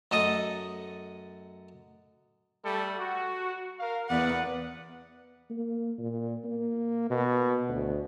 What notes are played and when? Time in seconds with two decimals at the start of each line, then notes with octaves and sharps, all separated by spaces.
0.11 F#2 A3 A4 D#5 D#6
2.65 G3 A3 A4
2.99 F#4
3.80 A#4 F5
4.09 E2 B4 D5 F#5
5.50 A#3
5.98 A#2
6.44 A#3
7.10 B2
7.68 D2